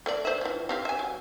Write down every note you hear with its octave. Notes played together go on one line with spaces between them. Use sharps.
A3 A#3 D5
C5 E5
E3 F3
C4 G4 F5
E5 G#5
F#3